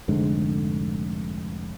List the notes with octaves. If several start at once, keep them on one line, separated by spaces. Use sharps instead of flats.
F1 G#2 D3 G#3